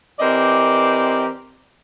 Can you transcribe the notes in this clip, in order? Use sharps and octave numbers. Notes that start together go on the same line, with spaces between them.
E3 C4 G4 A#4 D5 D#5